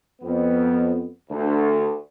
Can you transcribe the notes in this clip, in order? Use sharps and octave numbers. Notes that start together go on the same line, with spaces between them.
F2 B3
D2